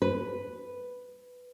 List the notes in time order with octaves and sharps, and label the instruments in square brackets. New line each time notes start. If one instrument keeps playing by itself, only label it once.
[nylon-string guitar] B4